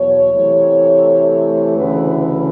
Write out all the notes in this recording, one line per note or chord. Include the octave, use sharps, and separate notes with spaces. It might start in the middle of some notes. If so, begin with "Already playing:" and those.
Already playing: E2 B2 F#3 C#5
C3 E3 A3
D2 C#3 E3 B4